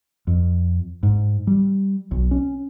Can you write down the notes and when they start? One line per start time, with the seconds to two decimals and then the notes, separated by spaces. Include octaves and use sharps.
0.27 F2
1.03 G#2
1.47 G3
2.11 B1
2.31 C#4